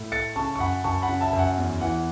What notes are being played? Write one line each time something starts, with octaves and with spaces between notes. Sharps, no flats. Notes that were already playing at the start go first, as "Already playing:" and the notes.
Already playing: A2
A3 A6 C#7
C#3 A5 C#6
C#6
F#2 F#5 B5
F#2 A5 C#6
F#5 B5
C#3
E5 A5
F#2
F#5
E2
E3 F#5